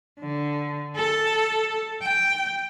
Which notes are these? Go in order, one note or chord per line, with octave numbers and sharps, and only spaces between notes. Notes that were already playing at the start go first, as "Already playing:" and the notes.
D3
A4
G5